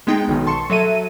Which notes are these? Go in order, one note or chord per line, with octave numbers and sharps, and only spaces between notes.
G#3 B3 D#4 G#4 G5
B1 D#3
A5 C6 C#6 C#7
F#3 A4 E5 D#7